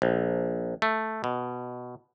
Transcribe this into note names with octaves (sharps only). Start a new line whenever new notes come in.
A#1
A3
B2